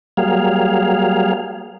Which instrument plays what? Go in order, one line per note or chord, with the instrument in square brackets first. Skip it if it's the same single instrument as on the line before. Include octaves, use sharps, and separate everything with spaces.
[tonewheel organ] F#3 G3 A#3 G#4 F5